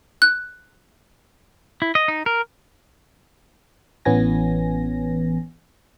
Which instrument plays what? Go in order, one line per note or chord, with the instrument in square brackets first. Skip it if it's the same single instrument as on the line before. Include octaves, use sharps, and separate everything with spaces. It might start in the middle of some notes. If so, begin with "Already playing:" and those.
[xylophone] F#6
[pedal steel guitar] E4
D#5
D#4
A#4
[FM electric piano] A1 E3 B3 C#4 G#5 A#6